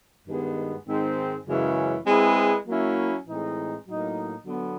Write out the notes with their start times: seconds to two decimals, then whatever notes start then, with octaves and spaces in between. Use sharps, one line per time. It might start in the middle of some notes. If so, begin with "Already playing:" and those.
0.28 G2 D#3 G#3 B3
0.88 G#2 D#3 G#3 C4
1.47 F#2 C#3 E3 G#3 C#4
2.07 G#3 C4 E4 G#4 B4
2.68 F#3 A#3 C#4 E4
3.26 A2 E3 G#3 C4 D#4
3.87 A2 F#3 A#3 D#4
4.46 D3 F#3 B3